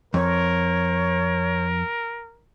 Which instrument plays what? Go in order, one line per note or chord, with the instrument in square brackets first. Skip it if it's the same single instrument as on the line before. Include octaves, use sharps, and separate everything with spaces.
[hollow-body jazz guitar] F2 [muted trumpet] A#4 [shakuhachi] C#5